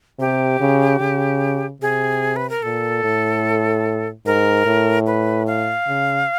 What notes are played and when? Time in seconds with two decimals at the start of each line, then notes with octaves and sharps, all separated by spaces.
0.19 C3 G4
0.61 C#3
1.01 C#3
1.82 C3 G#4
2.36 B4
2.49 A#4
2.63 A#2 A4
3.04 A2
4.26 G#2 A#4
4.66 A2
5.07 B4
5.47 F5
5.88 C#3